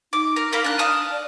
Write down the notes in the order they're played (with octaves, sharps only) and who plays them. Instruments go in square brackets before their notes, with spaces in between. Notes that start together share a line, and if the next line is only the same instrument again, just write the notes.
[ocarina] D#4 [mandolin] D6
[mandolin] A#4
[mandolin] A#3 A#4 B5 [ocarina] F5
[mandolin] D4 F#6
A5 D#6 F6
[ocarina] D5